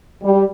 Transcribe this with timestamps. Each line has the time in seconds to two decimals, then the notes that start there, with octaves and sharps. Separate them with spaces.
0.23 G3